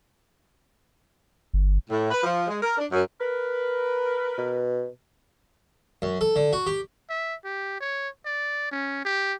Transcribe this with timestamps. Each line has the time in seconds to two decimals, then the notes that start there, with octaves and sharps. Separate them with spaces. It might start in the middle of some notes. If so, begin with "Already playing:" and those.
1.54 G1
1.90 A2
2.11 B4
2.23 F3
2.48 G#3
2.63 A#4
2.77 D4
2.91 F#2
3.21 A#4 B4
4.38 B2
6.02 F#2
6.21 A4
6.36 D3
6.53 F#4
6.67 G4
7.09 E5
7.45 G4
7.80 C#5
8.26 D5
8.71 C#4
9.05 G4